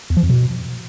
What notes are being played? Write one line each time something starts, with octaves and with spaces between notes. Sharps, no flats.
E2
F3
F2
B2